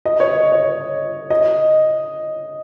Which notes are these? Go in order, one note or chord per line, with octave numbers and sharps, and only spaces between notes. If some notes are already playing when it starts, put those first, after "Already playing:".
D#5
C#5
C#5
D#5